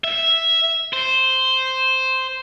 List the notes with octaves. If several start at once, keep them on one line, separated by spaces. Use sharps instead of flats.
E5
C5